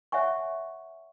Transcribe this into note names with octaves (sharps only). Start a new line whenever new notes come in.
C#5 E5 F#5 G#5 C#6